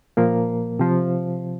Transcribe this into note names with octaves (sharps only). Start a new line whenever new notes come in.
A#2 F3 A#3 A#4
C3 F3